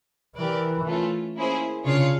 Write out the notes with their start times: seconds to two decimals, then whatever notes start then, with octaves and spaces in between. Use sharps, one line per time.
0.37 E3 G4 A#4 D5
0.86 A3 C#4 F4
1.36 A#3 C#4 E4 G#4 C5
1.85 C#3 D4 F4 G#4 C#5 F5